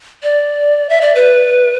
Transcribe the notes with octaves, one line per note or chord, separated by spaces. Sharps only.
D5
E5
D5
B4